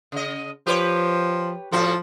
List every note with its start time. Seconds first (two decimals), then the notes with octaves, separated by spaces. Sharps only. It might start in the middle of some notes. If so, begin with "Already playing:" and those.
0.12 C#3 D#5
0.67 F3 G4 B4 C#5
1.72 A2 F3 F#4 A4